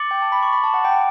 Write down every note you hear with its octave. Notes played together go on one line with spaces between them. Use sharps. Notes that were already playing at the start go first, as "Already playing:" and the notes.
Already playing: D6 A6 C#7 F#7
G5
A5
B5
C#6
B5
A5
F#5
G5